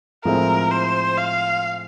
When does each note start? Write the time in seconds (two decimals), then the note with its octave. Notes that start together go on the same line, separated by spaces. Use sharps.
0.24 A2 F3 G#3 C4 E4 A#4
0.71 C5
1.18 F5